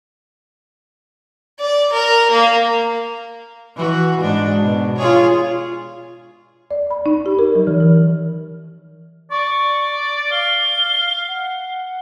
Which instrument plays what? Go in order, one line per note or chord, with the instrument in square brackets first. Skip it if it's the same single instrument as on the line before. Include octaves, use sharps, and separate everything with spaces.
[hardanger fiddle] D5
A#4
A#3
[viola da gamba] E3 F#4
G#2 D4
B2
F4 G#4 C#5
[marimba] D5
B5
D#4
G4
A#4
F#3
E3
E3
[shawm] D5 [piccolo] C#6
[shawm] F5 [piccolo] G7
[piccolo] F#5